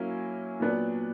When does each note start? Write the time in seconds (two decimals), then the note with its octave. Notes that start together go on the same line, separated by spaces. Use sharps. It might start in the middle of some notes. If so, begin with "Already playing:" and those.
Already playing: F#3 A#3 C#4 E4
0.60 A#2 F#3 B3 D4